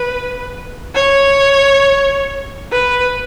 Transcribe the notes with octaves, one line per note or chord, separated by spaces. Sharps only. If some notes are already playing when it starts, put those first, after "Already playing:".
Already playing: B4
C#5
B4